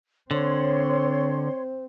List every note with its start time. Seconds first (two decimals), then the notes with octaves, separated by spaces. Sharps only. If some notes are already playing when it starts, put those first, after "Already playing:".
0.31 D3 C4 C5 C#5 C6